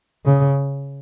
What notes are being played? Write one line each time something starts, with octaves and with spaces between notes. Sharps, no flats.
C#3